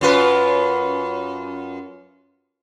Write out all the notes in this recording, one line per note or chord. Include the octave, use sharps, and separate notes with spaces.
F#2 F4 B4